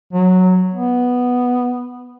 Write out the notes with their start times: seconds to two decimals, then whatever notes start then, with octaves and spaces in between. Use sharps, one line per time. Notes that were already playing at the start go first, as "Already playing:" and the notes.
0.13 F#3
0.74 B3